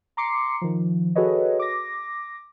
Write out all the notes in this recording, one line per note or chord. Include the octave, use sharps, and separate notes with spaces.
A#5 C6 D6 C7 C#7
D#3 F3
F#4 G#4 A4 B4 C#5 D#5
D6 A#6